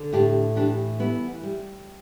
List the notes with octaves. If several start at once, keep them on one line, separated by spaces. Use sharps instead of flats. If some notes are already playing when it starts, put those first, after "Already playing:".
Already playing: D3
A2 D4 G4
E3 D4 G4
G3 B3 E4
G3